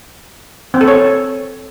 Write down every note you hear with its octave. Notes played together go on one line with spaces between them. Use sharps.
C4
A4
C#5